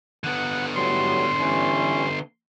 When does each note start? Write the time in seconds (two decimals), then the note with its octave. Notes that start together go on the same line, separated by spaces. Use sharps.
0.24 D3 B3 F#5
0.75 A2 F#3 G3 C6
1.40 E3 G3 C#4